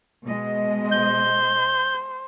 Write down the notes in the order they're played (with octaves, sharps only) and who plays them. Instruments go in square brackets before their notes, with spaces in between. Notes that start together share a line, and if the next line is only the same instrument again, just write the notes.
[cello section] B2 G#3 D#5
[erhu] C5 [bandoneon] G6